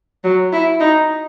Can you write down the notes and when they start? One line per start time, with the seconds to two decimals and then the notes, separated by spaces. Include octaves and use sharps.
0.24 F#3
0.53 E4
0.80 D#4